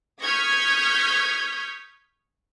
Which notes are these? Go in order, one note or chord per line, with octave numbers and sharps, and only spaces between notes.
C#6 D#6 F6 G6 G#6 B6